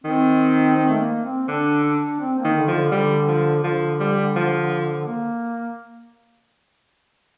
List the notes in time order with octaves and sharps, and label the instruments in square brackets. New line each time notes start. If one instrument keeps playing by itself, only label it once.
[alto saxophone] D#3 [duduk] C4
[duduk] C4
A3
A#3
C4
[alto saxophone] D3 [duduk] D4
[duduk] D4
C4
A#3
[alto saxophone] D#3
[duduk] D3
[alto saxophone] F3
[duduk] D3
[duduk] D3 [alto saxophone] G3
[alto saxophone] F3
[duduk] D3 [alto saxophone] F3
[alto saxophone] G3
F3
[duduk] A#3